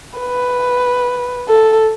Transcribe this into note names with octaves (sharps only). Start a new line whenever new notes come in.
B4
A4